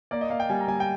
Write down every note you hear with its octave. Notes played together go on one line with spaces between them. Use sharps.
A#3 D5
D#5
A#3 F5
G5
G3 G#5
A#5
G3 G#5
G5